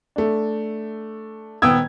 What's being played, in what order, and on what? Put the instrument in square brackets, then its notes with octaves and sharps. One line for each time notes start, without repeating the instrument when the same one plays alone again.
[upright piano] A3 D4
D#1 B3 G5 D#6 E6 G#6